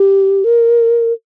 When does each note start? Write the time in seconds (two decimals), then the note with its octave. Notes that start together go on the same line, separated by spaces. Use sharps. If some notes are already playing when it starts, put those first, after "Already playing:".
Already playing: G4
0.44 A#4